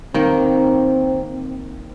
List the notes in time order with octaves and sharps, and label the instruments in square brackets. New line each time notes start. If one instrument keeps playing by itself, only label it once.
[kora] D#3 A#3 [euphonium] C4